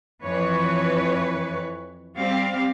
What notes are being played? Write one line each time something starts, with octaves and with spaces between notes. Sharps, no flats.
F2 E3 B4 C#5
G3 C4 G4 F5